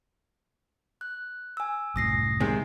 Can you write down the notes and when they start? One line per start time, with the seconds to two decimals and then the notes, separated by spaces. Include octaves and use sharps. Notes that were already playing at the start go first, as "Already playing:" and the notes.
1.01 F#6
1.57 G#5 E6
1.96 C2 F#2 A2 D#6 A#6 C7
2.40 C3 D#3 G#3 G#5